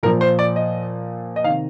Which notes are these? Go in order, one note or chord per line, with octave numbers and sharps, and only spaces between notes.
A#2 F3 A#4
C5
D5
D#5
D#5
C3 D#3 F5